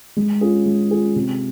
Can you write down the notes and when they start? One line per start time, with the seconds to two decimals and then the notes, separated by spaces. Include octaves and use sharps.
0.17 G#3
0.41 C#4 F4 G#4
0.66 G#3
0.91 C#4 F4 G#4
1.16 C3